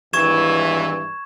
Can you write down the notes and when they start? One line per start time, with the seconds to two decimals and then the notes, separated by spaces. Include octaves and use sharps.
0.13 G#1 G2 E3 C#6 G#6 E7